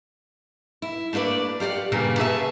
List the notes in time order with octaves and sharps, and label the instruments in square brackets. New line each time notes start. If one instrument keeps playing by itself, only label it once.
[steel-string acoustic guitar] E4
A3 A#3 D4 B4 D5
F4 G4 D5 F#5
G2 A#2 C#3 G3 A#3 B3
C#4 G#4 B4 E5 A5